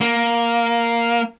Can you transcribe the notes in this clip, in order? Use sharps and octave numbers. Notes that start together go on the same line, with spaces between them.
A#3